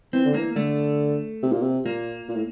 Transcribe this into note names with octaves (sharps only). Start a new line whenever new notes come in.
E3 C4
D3
E3 A#3
D3 A3
C3
A#2
C3
A#2 A#3
A#2
A2